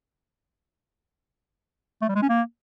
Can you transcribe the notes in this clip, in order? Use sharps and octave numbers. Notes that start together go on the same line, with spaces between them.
A3
G3
G#3
C#4
A#3